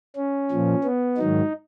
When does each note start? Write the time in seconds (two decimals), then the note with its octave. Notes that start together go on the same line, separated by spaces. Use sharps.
0.16 C#4
0.51 A#2 F3
0.84 B3
1.18 G#2 D#3 F#3 D#4